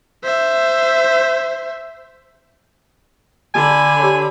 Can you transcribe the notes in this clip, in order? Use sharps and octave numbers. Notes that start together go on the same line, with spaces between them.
C5 E5
D3 G#5 A5 B5
G4 C#5